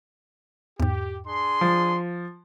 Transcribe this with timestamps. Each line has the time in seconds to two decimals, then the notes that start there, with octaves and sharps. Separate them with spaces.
0.80 E2 G#2 G4
1.27 D4 G#4 C6
1.61 F3